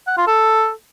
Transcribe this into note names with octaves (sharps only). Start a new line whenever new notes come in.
F#5
F4
A4